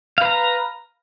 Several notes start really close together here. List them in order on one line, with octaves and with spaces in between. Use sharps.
F5 B4 A#5